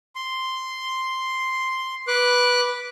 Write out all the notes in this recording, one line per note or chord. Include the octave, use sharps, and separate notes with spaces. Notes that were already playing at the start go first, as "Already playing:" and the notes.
C6
B4 D6 F#6